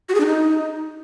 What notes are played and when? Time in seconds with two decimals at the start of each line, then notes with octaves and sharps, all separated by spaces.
0.09 F#4
0.15 G#4
0.20 D4
0.26 D#4